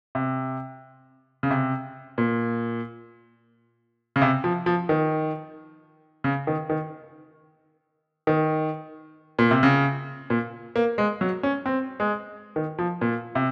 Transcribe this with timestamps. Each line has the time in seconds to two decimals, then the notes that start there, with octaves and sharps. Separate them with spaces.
0.15 C3
1.43 C#3
1.51 C3
2.18 A#2
4.16 C#3
4.22 C3
4.44 F3
4.66 F3
4.89 D#3
6.24 C#3
6.47 D#3
6.70 D#3
8.27 D#3
9.39 A#2
9.51 C3
9.63 C#3
10.30 A#2
10.76 A#3
10.98 G#3
11.21 F#3
11.43 C#4
11.66 C4
12.00 G#3
12.56 D#3
12.79 F3
13.01 A#2
13.35 C3